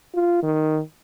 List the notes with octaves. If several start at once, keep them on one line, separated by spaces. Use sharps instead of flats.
F4
D#3